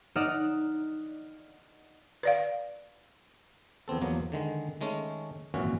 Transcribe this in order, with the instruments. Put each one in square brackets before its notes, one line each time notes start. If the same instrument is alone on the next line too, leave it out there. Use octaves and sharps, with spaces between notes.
[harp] D#4 D5 D#5 F#5 F6 E7
[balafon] B4 D5 F5
[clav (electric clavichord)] E2 B3 C4 A4
E2 F3 F#3 A#3 B3
D3 D#3 G#3
D#3 G#3 A3 C#4
G#1 F#2 A#2 E3 C#4 F#4